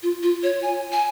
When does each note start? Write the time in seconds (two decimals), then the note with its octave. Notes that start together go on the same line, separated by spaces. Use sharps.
0.03 F4
0.23 F4
0.43 C#5
0.63 G#5
0.92 G#5